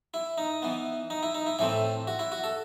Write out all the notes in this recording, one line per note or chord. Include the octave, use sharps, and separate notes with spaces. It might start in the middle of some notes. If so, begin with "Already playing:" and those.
E4
D#4
E3 B3
D#4
E4
D#4
E4
A2 E3 A3 C4 E4
F#4
E4
F#4
A4